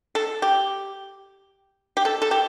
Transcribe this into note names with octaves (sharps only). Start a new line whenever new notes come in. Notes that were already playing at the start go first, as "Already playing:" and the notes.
A4
G4
G4
A4
A4
G4